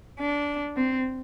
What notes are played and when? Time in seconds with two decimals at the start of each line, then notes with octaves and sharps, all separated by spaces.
0.20 D4
0.77 C4